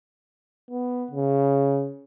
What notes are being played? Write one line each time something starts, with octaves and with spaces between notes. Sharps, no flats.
B3
C#3